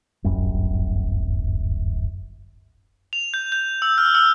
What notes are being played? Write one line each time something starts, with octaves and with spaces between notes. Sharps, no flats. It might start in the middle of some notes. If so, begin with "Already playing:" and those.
D1 G1 F#2 G3
F7
G6
G6
E6
F6
E6